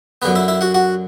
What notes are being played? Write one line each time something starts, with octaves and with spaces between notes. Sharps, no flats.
F#2 D3 B3 B4
E4 E5
E4 E5
F#4 F#5
F#4 F#5